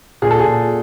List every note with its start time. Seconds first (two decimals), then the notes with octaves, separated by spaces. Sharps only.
0.22 A#2 G#4
0.31 A4
0.39 G#4
0.45 A#2